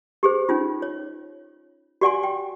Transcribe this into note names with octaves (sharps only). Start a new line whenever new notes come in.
G4 G#4 C5
C#4 D#4 F4
C#5
F#4 G4 D5 F#5 G#5 C6
G5